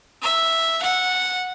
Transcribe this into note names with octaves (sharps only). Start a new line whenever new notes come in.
E5
F#5